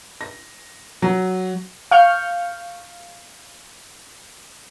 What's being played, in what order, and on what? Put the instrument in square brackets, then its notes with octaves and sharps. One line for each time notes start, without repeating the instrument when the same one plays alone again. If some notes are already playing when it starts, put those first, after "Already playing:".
[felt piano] A#6
F#3
[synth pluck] F5 C#6 F6 G6